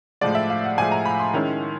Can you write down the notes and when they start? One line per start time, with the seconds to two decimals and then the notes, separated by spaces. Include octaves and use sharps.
0.21 A2 F3 G#3 D5
0.35 E5
0.50 F5
0.64 F#5
0.78 A2 F3 G#3 G#5
0.92 A#5
1.05 B5
1.19 C6
1.34 D#3 G#3 C#4 E4